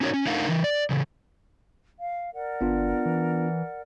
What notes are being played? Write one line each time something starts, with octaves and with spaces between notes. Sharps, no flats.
C#4 D#4 F#4 G4 A#4 C#5
C#4
A3 D4 D#4 A#4 F5 F#5
E3 A#4
D5
C#3 E3
F5
A#4 D5 F#5
G1 B3 D4 F4
E3